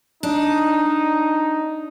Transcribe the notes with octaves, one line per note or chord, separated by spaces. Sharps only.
D4 D#4